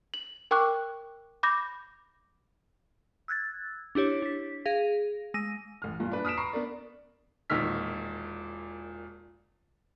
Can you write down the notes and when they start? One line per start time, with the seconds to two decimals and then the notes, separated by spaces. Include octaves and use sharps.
0.14 F#7
0.51 A#4 G5 C#6 D6 F#6
1.43 B5 D6 G6 A#6
3.28 E6 F#6 G#6 A6
3.95 D4 E4 G4 C#5
4.22 D4 B6
4.65 G#4 F5 A#6
5.34 G#3 E6 A#6 D#7
5.82 A1 F6
6.00 G2 A#2 F4
6.12 D4 B4
6.25 D#6 F6 B6 D7 E7
6.37 A#5 B5 C#6 C7
6.53 B3 D4 A#4 D5
7.50 E1 A#2 D#3 E6 F6 B6